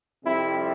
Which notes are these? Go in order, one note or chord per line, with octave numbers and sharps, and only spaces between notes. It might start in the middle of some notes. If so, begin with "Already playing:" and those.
F2 C3 G3 C4 E4